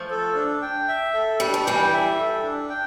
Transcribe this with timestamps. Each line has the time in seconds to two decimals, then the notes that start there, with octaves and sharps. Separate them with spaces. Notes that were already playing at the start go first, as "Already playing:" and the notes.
Already playing: F3 A3
0.10 A4
0.36 D4
0.62 G5
0.88 E5
1.14 A4
1.40 G3 D4
1.54 A3
1.65 E3 G3 G5
1.92 E5
2.18 A4
2.44 D4
2.69 G5